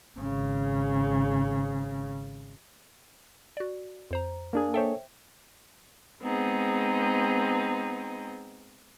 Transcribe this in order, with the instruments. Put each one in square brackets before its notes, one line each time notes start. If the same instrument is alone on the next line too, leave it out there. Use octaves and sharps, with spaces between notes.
[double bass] G#1 C#3
[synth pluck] F#4 D5
F2 C5 A#5
[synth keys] A#3 D4 G#4
[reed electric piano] A4 C#5 [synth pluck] C5 E5 G5
[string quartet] G#3 B3 C4 D#4 G#4